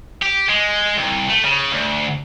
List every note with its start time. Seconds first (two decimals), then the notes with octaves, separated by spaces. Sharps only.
0.23 G4
0.49 G#3
0.97 C2
1.30 A3
1.45 C#3
1.73 D2